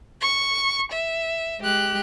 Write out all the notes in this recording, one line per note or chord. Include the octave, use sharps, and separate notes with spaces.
C#6
E5
G#3 G4 F#6